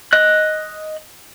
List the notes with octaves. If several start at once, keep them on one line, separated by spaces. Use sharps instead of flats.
D#5 F#6